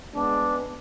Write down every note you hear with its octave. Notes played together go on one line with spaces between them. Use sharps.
G#3 B3 D4